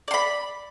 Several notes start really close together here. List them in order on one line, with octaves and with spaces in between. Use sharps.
D5 C6 B5